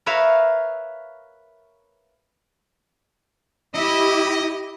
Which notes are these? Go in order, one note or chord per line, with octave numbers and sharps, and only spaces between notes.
A#4 B4 C#5 E5 F5
E4 G4 D#5